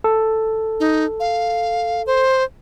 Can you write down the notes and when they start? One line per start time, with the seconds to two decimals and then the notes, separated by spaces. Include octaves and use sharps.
0.04 A4
0.80 D#4
1.20 F5
2.07 C5